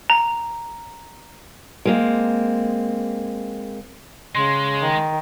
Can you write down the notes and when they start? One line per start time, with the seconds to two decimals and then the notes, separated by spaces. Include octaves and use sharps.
0.10 A#5
1.85 G#3 A#3 C4
4.35 C#3 G#3 C6
4.82 D#3